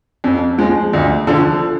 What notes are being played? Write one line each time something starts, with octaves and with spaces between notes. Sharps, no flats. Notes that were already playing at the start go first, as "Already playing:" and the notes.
F2
F3 G#3
D2
D3 F3